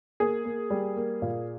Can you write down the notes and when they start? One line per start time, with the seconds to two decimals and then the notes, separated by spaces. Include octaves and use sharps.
0.20 A#3 G#4
0.45 A#3
0.70 G3
0.97 A#3
1.22 A#2